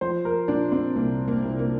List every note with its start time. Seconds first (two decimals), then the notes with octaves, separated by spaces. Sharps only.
0.01 F3 C5
0.25 A#4
0.48 A#2 D4
0.72 C4
0.95 C2 A#3
1.28 A#3
1.43 C2
1.59 A#3